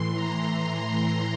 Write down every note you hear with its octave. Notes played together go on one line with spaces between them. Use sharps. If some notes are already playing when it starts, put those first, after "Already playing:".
Already playing: A2 E3 C6
A#5